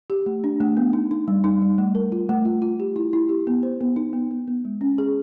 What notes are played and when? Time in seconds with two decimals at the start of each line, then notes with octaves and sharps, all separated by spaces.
0.10 G4
0.26 A3
0.44 D4
0.60 A3
0.77 B3
0.93 D#4
1.11 D#4
1.28 G3
1.44 D#4
1.62 G3
1.78 A3
1.95 A#4
2.12 F4
2.29 A3
2.45 F4
2.62 F4
2.80 G4
2.96 E4
3.13 E4
3.29 G4
3.47 B3
3.63 C5
3.81 B3
3.96 D#4
4.13 B3
4.31 B3
4.48 B3
4.65 G#3
4.81 C#4
4.98 G#4